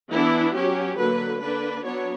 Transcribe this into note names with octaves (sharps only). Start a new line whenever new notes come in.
E3 B3 D4 E4
F#3 C#4 G4
D3 F#3 A#3 B4
D3 A#3 D4 B4
F#3 B3 D4 C#5